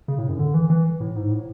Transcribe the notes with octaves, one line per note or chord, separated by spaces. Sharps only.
C#3
A2
F#2
D3
E3
E3
A2
G#2
A2